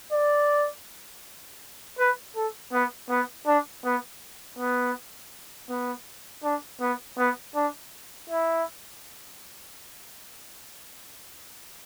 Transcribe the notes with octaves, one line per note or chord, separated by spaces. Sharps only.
D5
B4
A4
B3
B3
D4
B3
B3
B3
D4
B3
B3
D4
E4